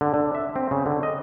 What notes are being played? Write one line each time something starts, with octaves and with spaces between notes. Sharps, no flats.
D3
D3
E5
C4
C#3
D3
D#5